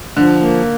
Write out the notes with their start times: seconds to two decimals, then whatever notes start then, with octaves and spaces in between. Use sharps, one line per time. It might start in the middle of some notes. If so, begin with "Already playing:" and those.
0.16 D3 F3
0.41 A#3